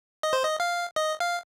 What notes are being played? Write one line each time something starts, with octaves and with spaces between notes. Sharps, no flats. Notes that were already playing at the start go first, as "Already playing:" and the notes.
D#5
C5
D#5
F5
D#5
F5